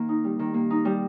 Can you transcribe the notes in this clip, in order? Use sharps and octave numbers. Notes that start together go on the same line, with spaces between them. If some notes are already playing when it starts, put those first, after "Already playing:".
Already playing: D#3 A#3
D#4
G3
D#3
A#3
D#4
G3